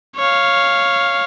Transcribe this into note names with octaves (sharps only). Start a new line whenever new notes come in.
C#5 F5